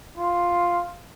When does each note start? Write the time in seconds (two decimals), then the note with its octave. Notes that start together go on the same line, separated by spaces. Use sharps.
0.18 F4